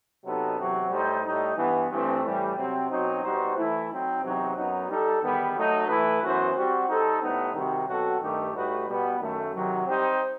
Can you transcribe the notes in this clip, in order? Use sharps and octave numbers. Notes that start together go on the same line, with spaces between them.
C3 F#3 B3 D#4 A4
E2 C3 F#3 C4 F#4
A2 G3 D#4 A4 C5
A2 G3 D#4
G2 E3 B3
G2 E3 A3 C4
A2 E3 G3
C3 F#3 C4
B2 F#3 C4 D#4
B2 G3 D#4 F#4 C5
E3 A3 E4
F#3 C4 D#4
E2 C3 F#3 C4 D#4
F#2 F#3 B3 D#4
G3 D#4 A4
E2 D#3 G3 B3
F#3 A3 D#4 F#4
E3 A3 E4 B4
F#2 E3 B3 F#4 C5
G3 C4 F#4
G3 D#4 A4 C5
A2 G3 B3 D#4
C3 D#3 G3 C4 F#4
B2 F#3 C4 F#4 A4
G2 D#3 A3 D#4 G4
A2 G3 D#4 F#4 B4
B2 G3 B3
F#2 D#3 A3
C3 D#3 F#3
G3 C4 D#4 G4 C5